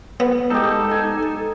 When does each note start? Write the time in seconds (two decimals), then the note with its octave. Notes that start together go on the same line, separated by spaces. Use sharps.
0.20 B3
0.50 G#3 D#4 G4 A4
0.91 D#4 G#5